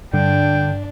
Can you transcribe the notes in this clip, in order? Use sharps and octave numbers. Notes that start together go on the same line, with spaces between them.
G2 D3 D4 G5